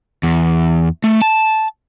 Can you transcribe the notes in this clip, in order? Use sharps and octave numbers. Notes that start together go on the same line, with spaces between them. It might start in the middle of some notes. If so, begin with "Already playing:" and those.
E2
A3
A5